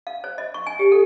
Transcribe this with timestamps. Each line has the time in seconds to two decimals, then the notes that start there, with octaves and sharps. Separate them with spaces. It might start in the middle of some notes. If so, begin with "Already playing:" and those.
0.07 F5
0.24 C5
0.38 D#5
0.54 C#6
0.67 G#5
0.79 G4
0.92 A4